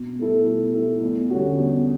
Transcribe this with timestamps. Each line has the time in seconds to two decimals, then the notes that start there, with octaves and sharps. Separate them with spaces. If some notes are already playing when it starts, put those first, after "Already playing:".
Already playing: B2
0.19 A3 E4 A4
0.46 B2
0.74 A3 E4 A4
1.02 E2
1.30 D3 G3 C#4 F#4
1.58 E2